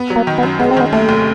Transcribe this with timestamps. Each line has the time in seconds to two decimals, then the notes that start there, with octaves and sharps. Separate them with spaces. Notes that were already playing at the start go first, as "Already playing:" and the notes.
Already playing: B3
0.10 F#3
0.16 A#3
0.27 D#3
0.38 B3
0.43 F#2
0.59 G#3 B3
0.71 C4
0.77 D#3 B3
0.93 D#2 A3
1.09 F1